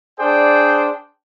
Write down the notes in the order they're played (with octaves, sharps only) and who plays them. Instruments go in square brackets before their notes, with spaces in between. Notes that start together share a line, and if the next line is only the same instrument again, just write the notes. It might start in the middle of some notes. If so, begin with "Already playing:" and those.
[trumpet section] D4 G#4 C5 D5 G5